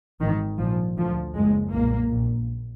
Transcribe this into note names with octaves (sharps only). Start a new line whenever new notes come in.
G#1 G#2 D#3
A#1 A#2 F3
D2 F3
F#1 F#2 G#3
B1 A#2 A#3
A#1 A#2